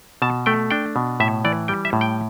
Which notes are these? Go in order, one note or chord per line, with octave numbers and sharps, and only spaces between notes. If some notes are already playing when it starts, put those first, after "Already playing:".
B2 A5
A3 G5
D4 G5
B2
A2 E5
E3 D5
G3 G5
E5
A2
G5